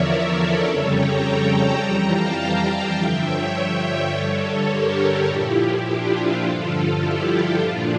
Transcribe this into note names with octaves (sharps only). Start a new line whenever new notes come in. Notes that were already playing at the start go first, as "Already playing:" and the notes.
Already playing: E2 D3 F3 A#4 C#5 D5 E5
A4 C#5
F2 C#3 G3
G5 A#5
A5 C#6
F2 E3 G3 G5 A#5
F5 A5
F5 A5
F5 A5
G2 D3 F3 E5 G5
C#5 E5
C#5 E5
G2 D3 G3 A4 C#5
G4 A#4
A#2 F3 E4 G4
D4 F4
E4 G4
G2 D3 F3 F4 A4
E4 G4
A#2 F3 D4 F4